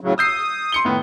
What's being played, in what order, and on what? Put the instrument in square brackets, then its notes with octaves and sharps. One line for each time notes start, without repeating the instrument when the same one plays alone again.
[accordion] A2 C#3 F#3
[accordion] D#6 [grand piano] E6 G6 C7
[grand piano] C6 C#7 G7
A2 D#3 B3